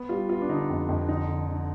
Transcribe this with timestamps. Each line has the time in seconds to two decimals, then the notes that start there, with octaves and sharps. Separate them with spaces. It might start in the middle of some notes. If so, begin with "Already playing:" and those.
Already playing: B3
0.09 G3 F4
0.29 B3 F4
0.41 D4
0.49 D3 D#4
0.70 F2
0.89 F2
1.08 D3 D#4
1.28 D3
1.48 D3